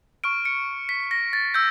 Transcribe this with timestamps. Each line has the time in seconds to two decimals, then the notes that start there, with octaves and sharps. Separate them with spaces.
0.24 C#6 F6 D7
0.45 C#7
0.89 B6
1.11 A#6
1.33 A6
1.54 E6 G6